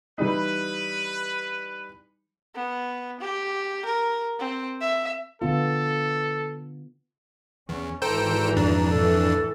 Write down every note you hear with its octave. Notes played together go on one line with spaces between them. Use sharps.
E3 G3 D#4 B4
B3
G4
A#4
C4
E5
D3 B3 F4 A4
E2 C#4
G#1 E3 A4 C5 G5 A#5
F2 D4
A2 E3 A4